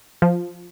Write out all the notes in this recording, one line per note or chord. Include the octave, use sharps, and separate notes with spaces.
F3